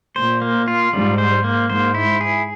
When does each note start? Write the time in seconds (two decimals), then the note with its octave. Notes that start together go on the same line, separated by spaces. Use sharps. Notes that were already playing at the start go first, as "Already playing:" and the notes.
0.16 A#2 C5
0.42 A#3
0.68 F4
0.92 G#2 G3
1.18 C5
1.44 A#3
1.69 G#2 C5
1.94 E4
2.21 G#4